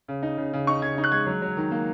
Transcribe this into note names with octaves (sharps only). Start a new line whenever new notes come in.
C#3
D#4
C#3
C#3
D#4 C#6
C#3 G#6
D#4
F#6
G#3 G#6
F#3
F#3
D#3
A#3